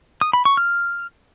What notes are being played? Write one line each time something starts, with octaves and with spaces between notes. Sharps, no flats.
D#6
B5
C#6
F6